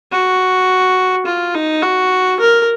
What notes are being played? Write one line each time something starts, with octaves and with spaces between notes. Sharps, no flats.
F#4
F4
D#4
F#4
A#4